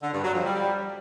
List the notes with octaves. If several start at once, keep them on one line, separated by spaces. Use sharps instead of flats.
D3
G2
F#3
F2
G3